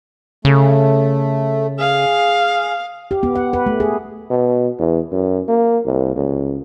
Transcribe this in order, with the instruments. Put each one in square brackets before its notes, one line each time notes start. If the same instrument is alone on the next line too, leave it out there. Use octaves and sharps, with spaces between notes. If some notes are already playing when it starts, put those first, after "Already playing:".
[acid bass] C#3 [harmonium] A3
[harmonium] G#4 [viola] F5
[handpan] G4
B3
F#5
B4
A3
G#4
[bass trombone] B2
E2
F#2
A#3
C2
C#2